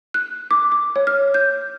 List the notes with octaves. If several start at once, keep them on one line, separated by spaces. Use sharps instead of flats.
F#6
D6
D6
C#5
F6
G6